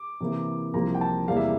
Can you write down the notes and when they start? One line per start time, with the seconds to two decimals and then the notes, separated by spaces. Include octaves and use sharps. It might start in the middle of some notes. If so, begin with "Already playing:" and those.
Already playing: D6
0.21 C3 E3 A#3 E4
0.74 C2 C3 F3 A#3 A#5
0.95 G5
1.01 A5
1.28 E2 C3 G3 A#3 E4 F5
1.37 E5